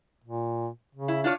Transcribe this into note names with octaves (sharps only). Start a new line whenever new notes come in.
A#2
C#3
E4
D4 F4 C#5